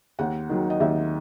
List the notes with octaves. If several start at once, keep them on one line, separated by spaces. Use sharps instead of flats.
D#2 F#5
D#3 F#3
D#5
D#2 E5